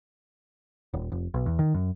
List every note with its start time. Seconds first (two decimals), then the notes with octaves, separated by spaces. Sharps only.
0.94 D#1
1.12 F1
1.34 B1
1.46 E2
1.59 D#3
1.74 F#2